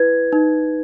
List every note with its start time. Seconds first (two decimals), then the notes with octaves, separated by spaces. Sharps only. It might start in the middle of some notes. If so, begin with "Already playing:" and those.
Already playing: E4 B4 G#6
0.33 D#4